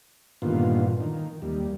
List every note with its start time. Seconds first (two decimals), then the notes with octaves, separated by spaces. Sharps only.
0.42 G2 A#2 D3 D#3 B3 F4
1.00 D#3
1.42 D#2 G3